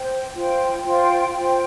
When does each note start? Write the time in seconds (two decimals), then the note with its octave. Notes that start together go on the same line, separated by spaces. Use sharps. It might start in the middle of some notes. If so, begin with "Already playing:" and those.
Already playing: C5 G5
0.34 F4 C5 G5
0.83 F4 C5 G5
1.33 F4 C5 G5